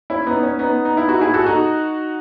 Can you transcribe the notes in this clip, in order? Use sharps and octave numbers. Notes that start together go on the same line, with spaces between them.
C#4 E4
B3 D#4
C#4
B3 D#4
D#4
E4
D#4 F#4
E4 G#4
F#4 A4
D#4 F#4